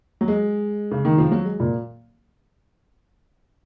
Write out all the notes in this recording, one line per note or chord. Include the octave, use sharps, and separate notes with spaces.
F#3
G#3
C#3
D#3
F3
F#3
G#3
A#2